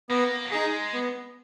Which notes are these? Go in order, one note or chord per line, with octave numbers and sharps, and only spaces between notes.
A#3 B3
F#3
G#3 D#4 G#4
B3